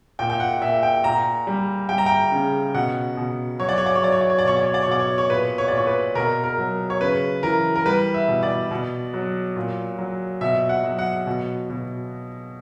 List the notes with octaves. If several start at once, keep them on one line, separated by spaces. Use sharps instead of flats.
A#2 G5
G5
F#5
A#2 E5
G5
A#2 A#5
G3
G3 G5
A#5
G5
C#3
B2 F#5
B2
F#3 C#5
D5
C#5
D5
C#5
F#3 D5
C#5
D5
C#5
D5
B2 C#5
D5
C#5
D5
C#5
B2 D5
C#5
C#5
A#2 B4
C#5
D5
A#2 C#5
B4
B2 A#4
A#4
F#3
C#5
C#3 B4
E3 A#4
A#4
G3 B4
E5
B2
D5
B2
F#3
A#2
F#3
B2 E5
F#5
F#3
F#5
B2
B2